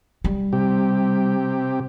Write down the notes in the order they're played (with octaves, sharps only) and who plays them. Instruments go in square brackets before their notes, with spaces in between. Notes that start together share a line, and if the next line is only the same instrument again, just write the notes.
[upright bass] G3
[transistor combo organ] C3 G4